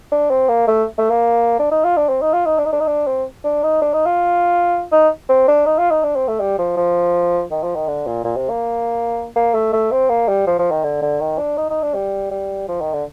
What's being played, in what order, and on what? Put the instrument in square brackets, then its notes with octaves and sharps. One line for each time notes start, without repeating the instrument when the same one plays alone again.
[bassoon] D4
C4
A#3
A3
A3
A#3
D4
D#4
F4
D4
C4
D#4
F4
D#4
D4
D#4
D4
D#4
D4
C4
D4
D#4
D4
D#4
F4
D#4
C4
D4
D#4
F4
D#4
D4
C4
A3
G3
F3
F3
D#3
F3
D#3
D3
A#2
A#2
C3
A#3
A#3
A3
A3
C4
A#3
G3
F3
F3
D#3
D3
D3
D#3
D4
D#4
D#4
D4
G3
G3
F3
D#3
D3